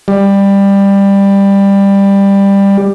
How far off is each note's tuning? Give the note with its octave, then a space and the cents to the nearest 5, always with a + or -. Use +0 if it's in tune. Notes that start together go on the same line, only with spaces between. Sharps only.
G3 +15